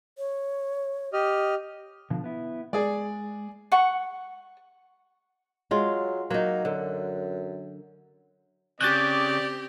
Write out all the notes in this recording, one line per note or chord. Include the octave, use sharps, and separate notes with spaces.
C#5
G4 D#5 F6
B2 D3 F3
B3 E4
G#3 G#4 D5
F#5 C#6
F#3 G#3 F4
F#3 A#3 D#4
F#2 D3
C#3 C4 G4 D5 F#6 G6 A6